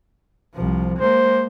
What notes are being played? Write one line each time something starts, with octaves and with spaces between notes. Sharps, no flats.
C2 F3
G#3 A#3 C5